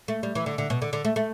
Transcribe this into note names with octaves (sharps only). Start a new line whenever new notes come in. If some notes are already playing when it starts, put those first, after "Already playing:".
A3
G3
E3
D3
D3
B2
D3
D3
A3
A3